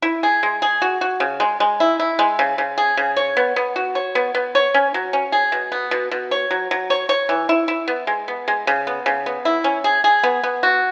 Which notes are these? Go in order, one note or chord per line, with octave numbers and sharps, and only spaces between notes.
E4
G#4
G#3
G#4
F#4
F#4
C#3
G#3
G#3
E4
E4
G#3
C#3
C#3
G#4
C#3
C#5
B3
B3
F#4
C#5
B3
B3
C#5
C#4
F#3
C#4
G#4
B2
B3
B2
B2
C#5
F#3
F#3
C#5
C#5
E3
E4
E4
B3
G#3
B3
G#3
C#3
B3
C#3
B3
E4
C#4
G#4
G#4
B3
B3
F#4